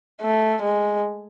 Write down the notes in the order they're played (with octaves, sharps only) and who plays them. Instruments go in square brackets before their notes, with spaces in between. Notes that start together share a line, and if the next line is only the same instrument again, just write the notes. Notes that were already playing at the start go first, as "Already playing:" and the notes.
[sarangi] A3
G#3